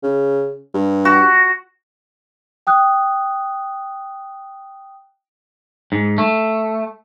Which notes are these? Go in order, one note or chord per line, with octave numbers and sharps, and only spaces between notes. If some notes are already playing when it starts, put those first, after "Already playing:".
C#3
G2
F#4
G5 D#6 F#6
G#2
A3